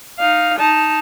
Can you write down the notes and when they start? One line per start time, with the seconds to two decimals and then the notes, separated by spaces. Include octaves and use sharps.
0.19 D#4 F5
0.58 D#4 A5